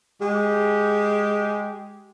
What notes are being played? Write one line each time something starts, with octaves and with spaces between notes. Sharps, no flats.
G#3 G4